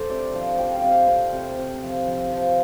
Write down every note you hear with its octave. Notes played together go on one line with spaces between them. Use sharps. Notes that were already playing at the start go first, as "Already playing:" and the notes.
Already playing: D4 A4 C5
C3 D5
F3 F5
F3 G5
F5
C3
F5
C4 C5
C3
C3
F3
F3
F3